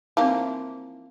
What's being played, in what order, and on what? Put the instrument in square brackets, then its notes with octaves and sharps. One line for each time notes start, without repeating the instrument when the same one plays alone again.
[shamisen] E3 F3 A#3 [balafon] C4 D#4